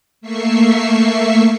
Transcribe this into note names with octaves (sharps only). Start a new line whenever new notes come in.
A3 A#3 E5 C#6 C7